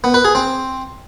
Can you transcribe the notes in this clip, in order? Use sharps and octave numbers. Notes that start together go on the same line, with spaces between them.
B3
B4
G#4
C4